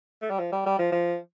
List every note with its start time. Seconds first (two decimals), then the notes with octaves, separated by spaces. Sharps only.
0.21 A3
0.30 G3
0.39 F3
0.52 G3
0.66 G3
0.79 F3
0.92 F3